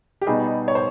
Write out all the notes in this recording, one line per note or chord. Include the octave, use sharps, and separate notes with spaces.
G4
B2 G3 B3 D#4 G#4
C#5
C5